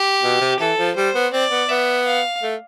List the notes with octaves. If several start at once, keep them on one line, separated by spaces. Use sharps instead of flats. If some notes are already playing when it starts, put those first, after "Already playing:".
Already playing: G4
B2
C3
E3 A4
F3
G3 C5
B3
C4 D5
B3
B3 E5
F5
A3